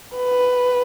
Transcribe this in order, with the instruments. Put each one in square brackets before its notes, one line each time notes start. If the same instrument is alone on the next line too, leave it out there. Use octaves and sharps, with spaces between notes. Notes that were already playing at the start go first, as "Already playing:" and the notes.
[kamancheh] B4